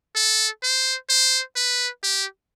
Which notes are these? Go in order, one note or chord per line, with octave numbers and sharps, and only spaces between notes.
A4
C5
C5
B4
G4